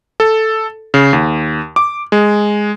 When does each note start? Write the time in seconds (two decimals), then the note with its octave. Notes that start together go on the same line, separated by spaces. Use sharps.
0.20 A4
0.94 C#3
1.13 D#2
1.76 D6
2.12 G#3